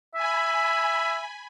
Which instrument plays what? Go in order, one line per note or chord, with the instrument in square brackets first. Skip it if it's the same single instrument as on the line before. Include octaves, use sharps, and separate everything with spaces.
[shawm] E5 [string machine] G#5 B5